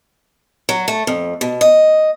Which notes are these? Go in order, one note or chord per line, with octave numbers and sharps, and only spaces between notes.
F#3
A3
F2
B2
D#5